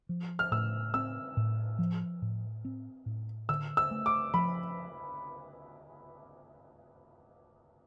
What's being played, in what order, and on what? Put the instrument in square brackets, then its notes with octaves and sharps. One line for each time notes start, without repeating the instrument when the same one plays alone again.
[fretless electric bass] F3
[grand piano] F6
[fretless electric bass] A2 [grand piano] E6
[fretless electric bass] C4 [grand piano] E6
[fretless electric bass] A2
F3
A2
C4
A2
[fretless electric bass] D3 [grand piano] E6
[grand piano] E6
[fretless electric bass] A3
[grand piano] D6
[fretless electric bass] F3 [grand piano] B5